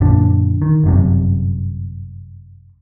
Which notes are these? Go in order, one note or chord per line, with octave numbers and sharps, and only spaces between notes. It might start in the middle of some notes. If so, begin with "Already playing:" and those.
F#2 A#2 D3 D4
D#3
G1 F#2 C3